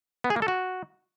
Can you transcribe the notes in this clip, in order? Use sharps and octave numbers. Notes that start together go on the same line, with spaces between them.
B3
G#4
A#3
A4
F#4